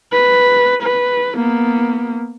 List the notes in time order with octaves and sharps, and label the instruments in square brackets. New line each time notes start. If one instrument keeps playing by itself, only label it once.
[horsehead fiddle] B4
B4
A#3 B3